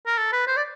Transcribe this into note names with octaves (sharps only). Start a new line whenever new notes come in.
A#4
A4
B4
C5
D5